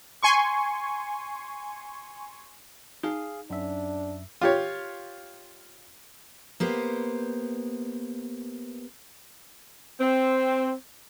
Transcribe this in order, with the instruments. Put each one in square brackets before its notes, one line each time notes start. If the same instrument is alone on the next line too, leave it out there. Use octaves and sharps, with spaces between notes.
[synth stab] G#5 C6 C#6
[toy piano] D#4 [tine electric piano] G#4 F5
[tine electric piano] F#2 E5 [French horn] D4
[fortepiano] F4 G4 C#5
[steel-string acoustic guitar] A#3 B3 G4 C5
[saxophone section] C4